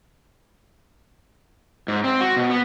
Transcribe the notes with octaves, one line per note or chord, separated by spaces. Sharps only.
G#2
C4
F#4
B2
B3